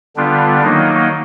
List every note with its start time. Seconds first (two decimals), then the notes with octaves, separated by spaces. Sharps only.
0.16 D3 G3 B3 D4 F4
0.63 D#3 F#3 A#3 D#4